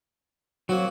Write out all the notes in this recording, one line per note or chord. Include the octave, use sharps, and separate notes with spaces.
F#3 A#3 C4 F#4